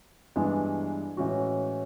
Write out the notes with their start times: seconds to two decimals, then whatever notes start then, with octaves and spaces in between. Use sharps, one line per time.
0.36 G2 E3 G#3 B3 D4
1.17 A2 E3 G#3 C#4 F#4